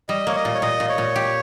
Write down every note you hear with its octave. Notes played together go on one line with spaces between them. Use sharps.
G3 D#5
A#3 C#5
D#5
A#2
C#5
A#2 D#5
A#2
C#5
A#2
G4